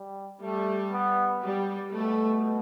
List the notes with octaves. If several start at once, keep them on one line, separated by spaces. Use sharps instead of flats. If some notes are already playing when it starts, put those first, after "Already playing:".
Already playing: G3
G3 A3
B3
G3
B2 A3